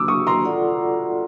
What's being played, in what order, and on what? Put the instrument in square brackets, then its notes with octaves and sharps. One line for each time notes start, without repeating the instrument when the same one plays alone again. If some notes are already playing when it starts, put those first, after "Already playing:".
Already playing: [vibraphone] F#3 A#3 D4 F#4 [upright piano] D6 E6
[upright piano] C#6 D#6
A#5 C6
[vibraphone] F4 A4 D5 F#5